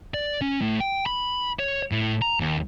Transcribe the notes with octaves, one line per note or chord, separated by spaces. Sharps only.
D5
C#4
A2
G5
B5
C#5
A2
A#5
D#2